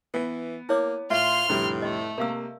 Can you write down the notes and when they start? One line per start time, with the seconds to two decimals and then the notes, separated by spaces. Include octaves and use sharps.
0.14 E3 B3
0.69 A#3 E4 C#5 D6
1.10 A2 F4 E5 C6 F6
1.49 F1 A2 D3 G3
1.82 A3 D#5 C6
2.18 C3 A#3 A#4 F5 E6